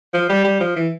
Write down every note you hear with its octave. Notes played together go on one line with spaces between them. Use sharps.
F3
G3
G3
F3
E3